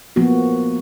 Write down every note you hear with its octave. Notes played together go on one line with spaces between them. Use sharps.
F3 A#3 B3 F#4